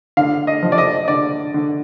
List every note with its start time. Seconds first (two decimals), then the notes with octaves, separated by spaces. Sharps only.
0.17 D3 F5
0.47 D#5
0.63 F3
0.72 D5
0.78 D#5
1.08 D3 D5
1.54 D3